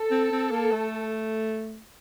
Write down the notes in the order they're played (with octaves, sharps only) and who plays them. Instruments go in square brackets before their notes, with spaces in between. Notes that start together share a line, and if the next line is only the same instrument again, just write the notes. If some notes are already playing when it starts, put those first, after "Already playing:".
Already playing: [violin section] A4
[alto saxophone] C4
C4
A#3
A3